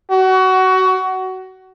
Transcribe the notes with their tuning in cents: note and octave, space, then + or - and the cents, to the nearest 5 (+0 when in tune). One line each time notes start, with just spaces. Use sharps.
F#4 +20